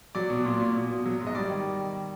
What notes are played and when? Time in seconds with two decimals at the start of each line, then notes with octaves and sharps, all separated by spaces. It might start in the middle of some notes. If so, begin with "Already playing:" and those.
0.15 F#3 D5
0.30 B2
0.45 A#2
0.60 A#2
0.75 B2
0.90 B2
1.06 F#3
1.21 G#2
1.27 D#5
1.35 G3 D5
1.50 D#3